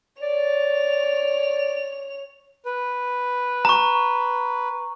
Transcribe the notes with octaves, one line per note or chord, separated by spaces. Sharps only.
C#5 D5 F7
B4
A#5 C#6